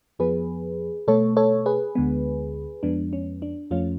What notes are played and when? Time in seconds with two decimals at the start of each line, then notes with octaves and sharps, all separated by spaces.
0.19 F2 F3 B3 G#4 B4
1.08 B2 A3 A4 C#5
1.37 A4 C#5
1.66 G#4 B4
1.95 D2 D3 G#3 B3
2.83 F2 F3 G#3 B3 D4
3.13 C#4
3.42 D4
3.71 F2 F3 A3 C#4 F4